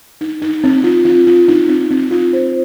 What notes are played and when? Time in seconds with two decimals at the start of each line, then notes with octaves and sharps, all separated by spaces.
0.21 D#4
0.42 D#4
0.64 C4
0.84 F4
1.05 F4
1.27 F4
1.48 D#4
1.68 C4
1.91 C4
2.11 F4
2.33 C5